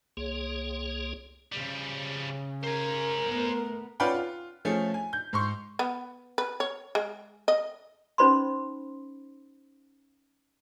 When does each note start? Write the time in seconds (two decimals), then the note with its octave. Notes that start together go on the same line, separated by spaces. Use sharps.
0.17 C2 A#3 G#4 C#5
1.52 C#3 F3 G3
2.63 A#4 C5 G#5
3.28 A3 B3
4.00 C#4 F4 B4 D5 F#5 G5
4.14 F4
4.65 F3 A3 C#4 G#4
4.94 G#5
5.13 G6
5.33 G#2 C6 C#6
5.79 B3
6.38 B4
6.60 C#5
6.95 G#3
7.48 D#5
8.18 C#4 D#4 C5 B5 C6